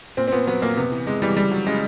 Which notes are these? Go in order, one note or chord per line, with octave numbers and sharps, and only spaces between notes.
A#2 C4
C4
A#2 B3
F#3 B3
A#2 A#3
C3 B3
E3
C3 G#3
E3 G3
C#3 G3
F#3
C#3 G#3